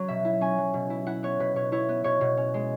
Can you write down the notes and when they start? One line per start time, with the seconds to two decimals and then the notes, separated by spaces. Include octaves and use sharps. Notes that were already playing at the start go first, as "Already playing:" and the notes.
Already playing: F#3 C#4 C#5
0.08 B2 E5
0.25 E4
0.41 C#4 G#5
0.58 F#3
0.74 B2
0.90 E4
1.06 E4 F#5
1.23 B3 C#5
1.40 B2 B4
1.56 B2 C#5
1.72 E4 C#5
1.89 B3
2.04 B2 C#5
2.21 B2
2.37 C#4
2.54 G#3